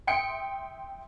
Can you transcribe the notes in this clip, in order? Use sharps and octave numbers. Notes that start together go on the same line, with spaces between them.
E5 G5 C6 D#6 C#7 D7